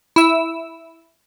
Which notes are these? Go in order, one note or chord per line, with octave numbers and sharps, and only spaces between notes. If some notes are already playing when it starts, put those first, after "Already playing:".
E4 E6